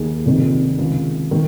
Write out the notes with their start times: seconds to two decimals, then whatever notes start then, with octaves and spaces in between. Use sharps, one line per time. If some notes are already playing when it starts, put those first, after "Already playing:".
Already playing: D#2 D#3 G#4
0.26 F1 F2 C3 D#3
0.78 C#2 C3 D#3
1.31 D#3